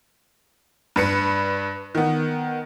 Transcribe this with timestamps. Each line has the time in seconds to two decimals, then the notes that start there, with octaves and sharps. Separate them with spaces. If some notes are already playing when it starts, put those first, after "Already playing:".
0.96 G2 B4 C#7
1.95 D#3 B3